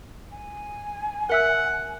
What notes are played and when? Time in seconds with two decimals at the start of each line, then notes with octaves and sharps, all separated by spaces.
0.31 G#5
1.30 A#4 E5 F#5 E6